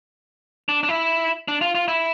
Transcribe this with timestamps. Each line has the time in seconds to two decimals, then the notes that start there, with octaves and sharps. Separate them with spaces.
0.69 D4
0.83 D4
0.89 E4
1.48 D4
1.61 F4
1.75 F4
1.88 E4